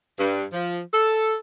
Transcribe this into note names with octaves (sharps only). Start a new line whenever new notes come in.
G2
F3
A4